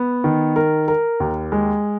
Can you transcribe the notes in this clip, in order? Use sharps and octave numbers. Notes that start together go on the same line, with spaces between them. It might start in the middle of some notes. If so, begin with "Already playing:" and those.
Already playing: B3
D#3
A#4
A#4
D#2
G#3